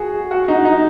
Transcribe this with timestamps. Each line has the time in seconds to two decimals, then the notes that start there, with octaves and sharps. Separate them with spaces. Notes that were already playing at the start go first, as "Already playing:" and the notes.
Already playing: F#4 G#4
0.31 F#4
0.48 D#4
0.65 D#4